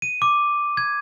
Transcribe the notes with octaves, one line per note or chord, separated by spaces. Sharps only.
D#7
D6
G#6